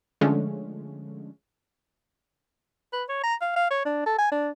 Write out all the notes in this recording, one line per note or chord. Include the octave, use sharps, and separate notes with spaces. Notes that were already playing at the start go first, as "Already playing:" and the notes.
D3 F3 G#3 A3 C#4
B4
C#5
A#5
F5
F5
C#5
D4
A4
G#5
D4